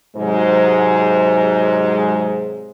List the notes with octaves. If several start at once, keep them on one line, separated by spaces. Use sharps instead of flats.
G#2 C3 F#3 G#3 C5